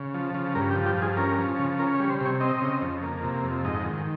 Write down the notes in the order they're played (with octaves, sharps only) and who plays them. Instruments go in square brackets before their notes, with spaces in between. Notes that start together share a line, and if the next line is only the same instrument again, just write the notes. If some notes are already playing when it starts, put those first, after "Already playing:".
Already playing: [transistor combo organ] C#3
F3
C#3
G2 A#4
G4
F3
G4
G2
G#4
C#4 A#4
F3
C#3
C#4 A#4
C#5
G3
C5
C3 C#5
C4 D#5
C#3
F2
A#3
C3
F2
G#2 D#5
D#3